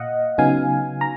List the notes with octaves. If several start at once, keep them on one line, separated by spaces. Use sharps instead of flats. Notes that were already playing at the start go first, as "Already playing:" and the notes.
Already playing: A#2 D#5 F5 F#5
C#3 F#3 B3 D#4 F5 G#5
A#5